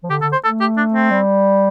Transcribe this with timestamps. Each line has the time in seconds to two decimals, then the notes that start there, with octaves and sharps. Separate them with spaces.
0.04 F3
0.10 D3 G4
0.21 D3 A4
0.32 C5
0.44 A3 A4
0.61 G4
0.77 D4
0.94 C4
1.11 G3